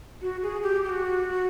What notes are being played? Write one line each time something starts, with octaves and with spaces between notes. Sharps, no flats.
F#4
G#4
G4
G4
F#4